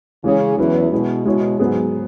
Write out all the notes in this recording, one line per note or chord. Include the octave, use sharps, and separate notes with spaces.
C#3 E3 G#3 C#4 G#4
E2 E3 F#3 C#4 E4 B4
B2 G#3 E4 G#4
B2 G#3 E4 G#4 C#5
G#2 F#3 B3 G#4